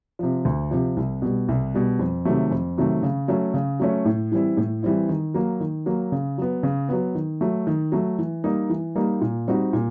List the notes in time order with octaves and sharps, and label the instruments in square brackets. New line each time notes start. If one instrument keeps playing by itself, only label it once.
[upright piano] C3 F3
D2
C3 F3
C2
B2 G3
C2
B2 G3
F2
C3 D#3 F#3 A3
F2
C3 D#3 F#3 A3
C#3
F#3 A3 C#4
C#3
F#3 A3 C#4
A2
E3 G3 C4 E4
A2
E3 G3 C4 E4
D#3
F#3 A#3
D#3
F#3 A#3
C#3
F#3 B3
C#3
F#3 B3
D#3
F#3 A3
D#3
F#3 A3
E3
G3 A#3 D#4
E3
G3 A#3 D#4
A#2
G3 C4 D#4 F#4
A#2